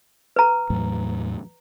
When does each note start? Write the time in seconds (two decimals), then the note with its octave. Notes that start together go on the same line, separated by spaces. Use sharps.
0.36 B4 A#5
0.70 E2 A2 F#3